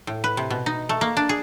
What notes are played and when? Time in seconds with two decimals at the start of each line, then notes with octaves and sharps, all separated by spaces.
0.07 A2
0.24 B4
0.37 C3
0.50 B2
0.66 D#4
0.89 A3
1.01 A#3
1.17 D4
1.29 G#4